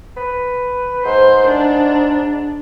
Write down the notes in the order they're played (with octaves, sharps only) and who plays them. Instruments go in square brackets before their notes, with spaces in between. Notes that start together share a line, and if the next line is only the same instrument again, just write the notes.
[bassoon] B4
[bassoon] G#2 [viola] C5
[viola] D4